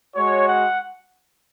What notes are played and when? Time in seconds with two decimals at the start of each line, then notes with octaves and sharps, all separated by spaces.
0.15 G#3 F#4 C#5
0.46 F#5